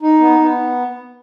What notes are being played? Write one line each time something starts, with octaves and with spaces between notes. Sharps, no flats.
D#4
B3
B3